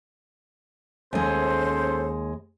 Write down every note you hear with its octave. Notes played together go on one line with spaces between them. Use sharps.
D#2 G#3 C#4 A4 C5